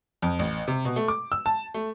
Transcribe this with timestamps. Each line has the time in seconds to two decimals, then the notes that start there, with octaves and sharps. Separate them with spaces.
0.22 F2
0.39 A1
0.68 C3
0.85 B2
0.96 A3
1.08 D6
1.32 E6
1.46 A5
1.74 A3